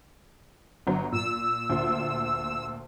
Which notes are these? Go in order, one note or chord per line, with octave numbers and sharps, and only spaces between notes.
G1 F#3
A#2 E6
D2 A#2